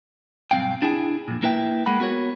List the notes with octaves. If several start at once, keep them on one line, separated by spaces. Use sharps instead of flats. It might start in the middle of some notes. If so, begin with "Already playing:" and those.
B1 G2 F3 C4 F5 G5
D4 E4 G#4 G5 G#5
F2 A#2
A#3 E4 B4 E5 G5
G#3 A#3 F#5 B5
B3 F#4 A#4 C#5